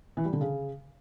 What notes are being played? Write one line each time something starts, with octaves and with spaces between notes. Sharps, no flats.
E3
G3
D3
C#3